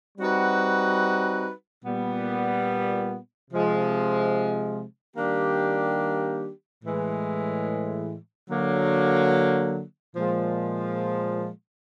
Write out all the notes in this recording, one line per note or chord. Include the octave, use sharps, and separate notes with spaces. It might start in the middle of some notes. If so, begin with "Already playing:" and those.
G3 C4 D#4 F#4 B4
A#2 G3 B3
C3 F3 G#3
D#3 G3 A#3 D4 G4
A2 E3 G#3
D3 F#3 A#3
A#2 F3 G#3